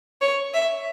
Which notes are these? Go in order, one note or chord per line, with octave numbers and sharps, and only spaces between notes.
C#5
E5